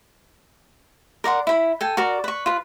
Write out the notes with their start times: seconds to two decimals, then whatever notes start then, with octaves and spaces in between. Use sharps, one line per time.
1.24 A#4 D5 F#5 C6
1.47 E4 B5
1.81 A4 G5 G#5
1.97 F#4 A#4 D5
2.24 B4 C#6
2.46 F4 B4